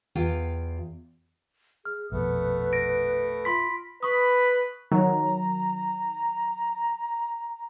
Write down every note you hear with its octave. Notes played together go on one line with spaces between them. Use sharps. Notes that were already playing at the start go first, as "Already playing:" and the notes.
E2 F4 F5 G5
G#4 F6
A#1 F2 B2 A3 B3 B4
A#6 D7
F4 B5 C6 B6
B4 B5 C#6 D#6
D#3 F#3 A#5